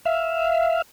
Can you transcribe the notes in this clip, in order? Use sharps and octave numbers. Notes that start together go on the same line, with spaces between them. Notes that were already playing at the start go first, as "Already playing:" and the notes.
E5 F5